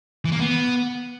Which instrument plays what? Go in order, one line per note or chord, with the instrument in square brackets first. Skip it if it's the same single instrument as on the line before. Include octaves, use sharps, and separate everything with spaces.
[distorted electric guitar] E3
A#3
B3